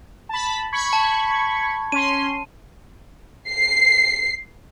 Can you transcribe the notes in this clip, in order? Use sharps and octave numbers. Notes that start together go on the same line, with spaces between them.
A5 B5
B5 C#6 G#6
A5
C#4 C6 D#7
C7